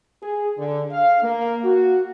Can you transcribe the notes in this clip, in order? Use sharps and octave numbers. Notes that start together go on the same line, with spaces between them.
G#4
D3
F5
A#3
F#4